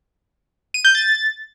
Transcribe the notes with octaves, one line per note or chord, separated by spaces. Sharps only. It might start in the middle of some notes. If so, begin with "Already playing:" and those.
D#7
G6
A6